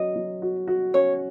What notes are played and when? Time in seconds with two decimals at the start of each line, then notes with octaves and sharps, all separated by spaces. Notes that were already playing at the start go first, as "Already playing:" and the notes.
Already playing: F#3 C#4 D#5
0.16 F#3
0.42 F#4
0.68 F#4
0.94 C#4 C#5